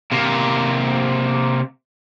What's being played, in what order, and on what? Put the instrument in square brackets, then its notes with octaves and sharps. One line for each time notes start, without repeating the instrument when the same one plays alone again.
[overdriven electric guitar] C3 A#3